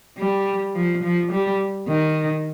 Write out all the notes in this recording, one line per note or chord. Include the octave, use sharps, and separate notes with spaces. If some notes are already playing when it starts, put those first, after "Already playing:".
G3
F3
F3
G3
D#3